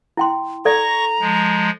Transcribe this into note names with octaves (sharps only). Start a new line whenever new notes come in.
E4 G5 C6
A4 D5 A#5 C#6 A#6
F3 G#3